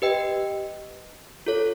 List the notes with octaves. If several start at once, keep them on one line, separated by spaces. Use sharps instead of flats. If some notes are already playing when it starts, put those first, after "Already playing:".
G4 B4 D#5 G5
F4 A4 C#5